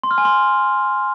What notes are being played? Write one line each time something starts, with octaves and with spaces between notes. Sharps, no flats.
C6
F6
G#5
C6